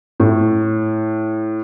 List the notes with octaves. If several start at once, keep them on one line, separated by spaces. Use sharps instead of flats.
A2